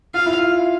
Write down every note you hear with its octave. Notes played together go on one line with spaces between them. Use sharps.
F4 F5
E4
F4